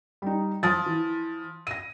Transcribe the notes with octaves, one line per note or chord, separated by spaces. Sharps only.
G3 D#4
F3 D#6 A6
E3
A#6 D#7